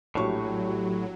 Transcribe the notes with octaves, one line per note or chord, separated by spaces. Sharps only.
A#1 A2 F#3 F#4 G4 C#5 C#6